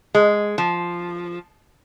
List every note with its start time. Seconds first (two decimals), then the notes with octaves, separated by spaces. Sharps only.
0.15 G#3
0.58 F3